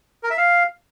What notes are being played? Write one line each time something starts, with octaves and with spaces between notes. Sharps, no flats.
A#4
E5
F5